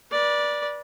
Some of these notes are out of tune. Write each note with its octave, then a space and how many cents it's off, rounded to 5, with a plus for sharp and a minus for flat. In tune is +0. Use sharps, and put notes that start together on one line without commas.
B4 -35 D5 +0